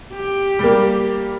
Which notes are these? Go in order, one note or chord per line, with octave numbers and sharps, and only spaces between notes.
G4
G3 A#3